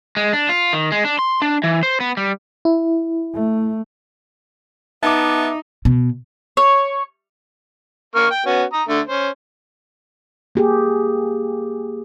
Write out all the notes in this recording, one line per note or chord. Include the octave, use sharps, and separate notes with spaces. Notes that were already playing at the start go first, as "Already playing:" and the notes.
G#3
D4
F4
D#3
G#3
D4
C6
D4
E3
C5
B3
G3
E4
A3
B3 D#4 E5 A5 D6
B2
C#5
A#3 C#6 F6
G5
B3 C#4 F#4
A#5 D#6
D3 A3
C#4 C5
A#3 G4 G#4